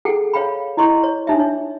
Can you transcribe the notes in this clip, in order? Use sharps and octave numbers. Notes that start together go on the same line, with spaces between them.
G#4 A4 F#5 G5
C#5 F5 G5 B5
E4 D#5 C6 C#6
C#5
D4 D#4 E5
C#5